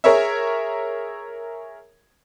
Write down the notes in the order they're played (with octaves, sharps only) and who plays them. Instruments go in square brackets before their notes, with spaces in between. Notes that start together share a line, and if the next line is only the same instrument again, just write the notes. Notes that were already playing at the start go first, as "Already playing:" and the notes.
[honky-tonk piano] G#4 A#4 C#5 E5